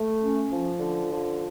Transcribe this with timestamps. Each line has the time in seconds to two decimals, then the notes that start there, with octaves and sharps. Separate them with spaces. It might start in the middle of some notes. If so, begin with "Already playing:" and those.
Already playing: A3
0.20 C#4
0.50 F3
0.80 D3
1.11 F3